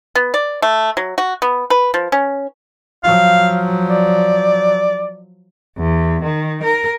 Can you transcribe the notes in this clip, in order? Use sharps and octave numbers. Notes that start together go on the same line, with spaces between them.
B3
D5
A3
F#3
F#4
B3
B4
F3
C#4
F3 F#3 F5
D5
E2
D#3
A#4